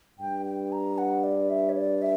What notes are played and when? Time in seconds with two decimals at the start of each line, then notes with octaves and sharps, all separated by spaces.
0.19 G2 G5
0.46 G5
0.72 A#5
0.98 F#5
1.24 D5
1.50 E5
1.69 C#5
1.77 D5
2.02 E5